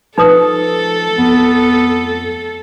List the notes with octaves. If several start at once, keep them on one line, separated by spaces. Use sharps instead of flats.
F3 D#4 A4 B4 D#6
F2 B3